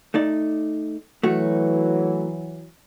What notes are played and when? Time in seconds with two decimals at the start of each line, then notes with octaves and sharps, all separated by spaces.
0.14 A3 D#4 D5
1.23 E3 F#3 A3 F#4